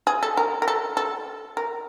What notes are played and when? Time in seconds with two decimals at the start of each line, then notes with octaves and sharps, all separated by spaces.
0.07 G#4
0.23 A4
0.37 A#4
0.62 A#4
0.68 A4
0.97 A4
1.57 A#4